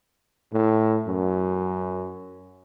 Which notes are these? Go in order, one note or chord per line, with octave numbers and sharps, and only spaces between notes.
A2
F#2